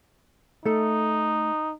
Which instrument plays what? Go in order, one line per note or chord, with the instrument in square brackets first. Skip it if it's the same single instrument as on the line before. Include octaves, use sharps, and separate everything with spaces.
[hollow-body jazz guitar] A3 A4 [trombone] D#4